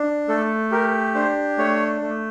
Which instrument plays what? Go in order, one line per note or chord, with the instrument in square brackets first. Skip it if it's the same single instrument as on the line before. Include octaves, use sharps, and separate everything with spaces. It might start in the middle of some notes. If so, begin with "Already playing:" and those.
Already playing: [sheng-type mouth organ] D4
A3 A4
G4 A#4
D4 C5
A3 C#5
A3